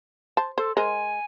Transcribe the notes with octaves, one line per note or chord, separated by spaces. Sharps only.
C5 A5
A4 C5
G#3 A#4 C5 G#5